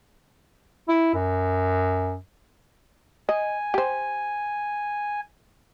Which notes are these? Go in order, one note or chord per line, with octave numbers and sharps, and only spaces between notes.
E4
F#2
D#5 G#5
G4 C5